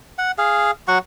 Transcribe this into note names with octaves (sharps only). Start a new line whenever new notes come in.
F#5
G#4 F5
F#3 F#4 F#5 C#6